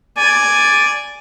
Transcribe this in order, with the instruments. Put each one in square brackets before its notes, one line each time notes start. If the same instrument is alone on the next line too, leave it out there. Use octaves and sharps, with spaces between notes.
[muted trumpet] D5 [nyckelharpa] G#5